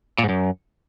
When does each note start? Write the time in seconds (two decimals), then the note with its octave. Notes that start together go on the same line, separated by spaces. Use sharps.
0.18 A#2
0.24 G#2
0.29 F#2